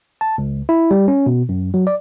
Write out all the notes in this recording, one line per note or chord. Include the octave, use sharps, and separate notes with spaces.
A5
C#2
E4
G3
C#4
B2
F#2
F#3
D5